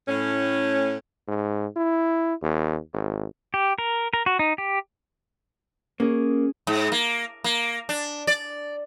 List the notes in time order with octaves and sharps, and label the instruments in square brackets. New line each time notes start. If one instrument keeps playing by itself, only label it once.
[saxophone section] A2 C#4
[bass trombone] G#2
E4
D#2
G#1
[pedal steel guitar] G4
A#4
A#4
F#4
D#4
G4
[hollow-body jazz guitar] A#3 [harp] C#4 G#4
[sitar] G#2
A#3
A#3
D4
D5